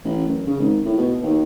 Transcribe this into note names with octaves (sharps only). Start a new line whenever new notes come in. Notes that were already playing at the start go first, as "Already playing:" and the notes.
A1
F#2
C#3
G#1
A2
B2
D#2